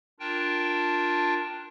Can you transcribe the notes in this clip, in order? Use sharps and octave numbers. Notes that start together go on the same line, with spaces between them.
D4 F4 A#4 G5 A5